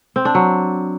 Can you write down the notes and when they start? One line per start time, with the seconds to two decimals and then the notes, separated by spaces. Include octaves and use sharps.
0.16 C4
0.25 D4
0.35 F#3